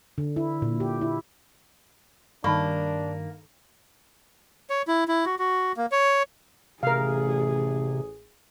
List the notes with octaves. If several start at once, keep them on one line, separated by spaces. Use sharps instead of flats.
D3
E4
A#2
G4
E4
G2 D#3 A#3 D4 A5 B5 C#6
C#5
E4
E4
F#4
F#4
A#3
C#5
A1 C3 G#4 A#4 F5